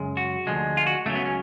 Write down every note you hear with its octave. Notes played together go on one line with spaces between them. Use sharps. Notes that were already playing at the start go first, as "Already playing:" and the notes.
Already playing: F#2 C#3 G#3
F#4
D2 D3 F3 G#3
F4
F#4
C#2 C#3 F#3 A3
B3
C#4